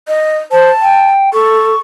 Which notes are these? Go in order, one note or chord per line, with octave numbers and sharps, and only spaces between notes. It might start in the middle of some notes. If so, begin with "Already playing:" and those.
D#5
C5 A5
G5
A4 C#6